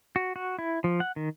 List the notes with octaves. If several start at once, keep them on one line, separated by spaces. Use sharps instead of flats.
F#4
F#4
E4
F3
F#5
D#3